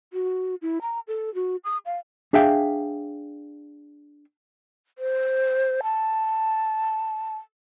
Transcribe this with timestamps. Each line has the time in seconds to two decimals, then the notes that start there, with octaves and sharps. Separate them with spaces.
0.13 F#4
0.62 E4
0.82 A#5
1.08 A4
1.34 F#4
1.64 D#6
1.86 F5
2.33 D4 G#4 E5 F5 G5
4.98 C5
5.83 A5